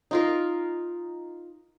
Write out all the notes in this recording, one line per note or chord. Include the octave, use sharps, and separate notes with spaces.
D#4 F4 A#4